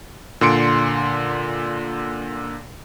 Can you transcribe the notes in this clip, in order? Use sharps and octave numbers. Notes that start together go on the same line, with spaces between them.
A#2 D3 C6 C#7 D7